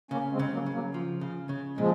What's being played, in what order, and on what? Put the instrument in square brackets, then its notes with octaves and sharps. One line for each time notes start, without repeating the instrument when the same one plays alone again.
[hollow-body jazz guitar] C#3 [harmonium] A#3 C#4
[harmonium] G#3 C4
[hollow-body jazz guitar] C#3
[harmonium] F#3 A#3
[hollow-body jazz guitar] C#3
[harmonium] F#3 A#3
[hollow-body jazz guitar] F3
C#3
C#3
[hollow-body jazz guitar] A#2 [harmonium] F3 G#3